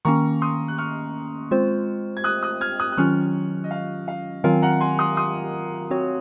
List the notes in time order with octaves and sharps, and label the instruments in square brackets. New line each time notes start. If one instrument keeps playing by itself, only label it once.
[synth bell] D#3 A#3 C#4 [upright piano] A#5 C#6
[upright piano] C6 D#6
F#6
C#6 F6
[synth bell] G#3 C4 F4 C5
[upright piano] G#6
D#6 F#6
D#6 F#6
F6 G#6
D#6 F#6
F#6
[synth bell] D#3 F#3 C#4 F4 [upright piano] C#6 F6
[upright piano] D#5
F5
F5
[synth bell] D#3 F#3 C4 F4 A#4 [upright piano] F5 G#5
[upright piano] F#5 A#5
G#5 C6
C6 D#6
C6 D#6
[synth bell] C4 F#4 C#5